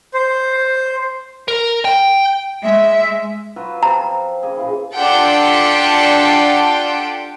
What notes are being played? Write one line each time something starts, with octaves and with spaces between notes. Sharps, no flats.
C5
A#4
G5
G#3 E5
F#3 F4 B4
F3 C4 A#5
C#3 A#3 G#4
A#2 E3
D4 F4 G4 A4 F#5 G5